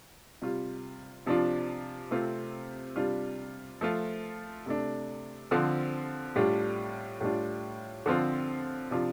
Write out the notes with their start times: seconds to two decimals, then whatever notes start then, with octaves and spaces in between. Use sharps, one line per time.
0.42 C3 G3 F4
1.26 C3 F3 D4 F4
2.11 C3 A3 C4 F4
2.96 C3 G3 D4 F4
3.81 F3 A3 F4
4.66 C3 A3 D4
5.51 D3 F3 C4 F4
6.36 A2 G3 D4 F4
7.21 A2 G3 D4 F4
8.06 D3 F3 C4 F4
8.91 C3 F3 D4 F4